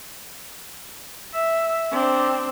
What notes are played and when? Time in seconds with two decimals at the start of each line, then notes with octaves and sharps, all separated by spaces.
1.33 E5
1.92 C4 D4